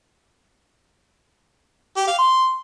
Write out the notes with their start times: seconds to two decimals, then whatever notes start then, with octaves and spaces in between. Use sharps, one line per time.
1.97 G4
2.07 F5
2.18 C6